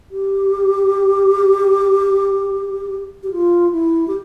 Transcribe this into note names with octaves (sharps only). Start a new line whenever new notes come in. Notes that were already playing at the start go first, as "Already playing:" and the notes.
G4
G4
F4
E4
G4